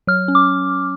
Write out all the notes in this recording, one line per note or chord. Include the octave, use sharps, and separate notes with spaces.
F#3 F6
C#4
D6